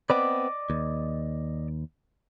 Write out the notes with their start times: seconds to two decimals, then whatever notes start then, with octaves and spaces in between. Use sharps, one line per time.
0.10 B3 C4 B4 D5 D#5 D6
0.70 D#2